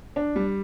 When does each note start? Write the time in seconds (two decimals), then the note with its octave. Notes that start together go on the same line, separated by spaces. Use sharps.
0.16 D4
0.36 G3